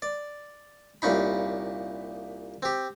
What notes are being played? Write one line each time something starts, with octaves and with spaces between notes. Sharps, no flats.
D5
C2 A#2 C#4 D#4 B5
C4 G4